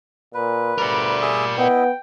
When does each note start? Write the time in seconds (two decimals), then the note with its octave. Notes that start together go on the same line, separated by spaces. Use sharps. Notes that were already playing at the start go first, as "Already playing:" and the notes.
0.34 A#2 B4
0.78 D2 G3 A#4 D5
1.22 G#4 E5 D#6
1.58 B3 E4 D#5 G5